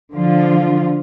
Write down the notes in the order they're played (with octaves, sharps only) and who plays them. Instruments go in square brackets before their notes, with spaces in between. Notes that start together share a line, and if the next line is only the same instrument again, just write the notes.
[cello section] D3 F3 F4